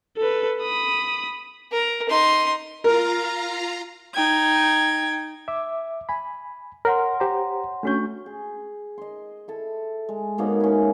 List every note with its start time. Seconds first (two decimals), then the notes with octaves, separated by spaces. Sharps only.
0.17 A4 B4
0.61 B5 D#6
1.72 A#4
2.09 D#4 C6
2.84 F4 A#4 F5 A#5
4.14 D#4 G5 G#6
5.48 E5 D6
6.09 G#5 B5
6.85 A#4 C#5 F#5 C6
7.20 G4 C5 A#5
7.83 A3 C#4 D4 F#4 C#6 G6
8.26 G#4
8.98 D#5 C6
9.48 E4 A4
10.09 G#3
10.38 G#2 B2 A#3 C#5
10.60 C#4 E4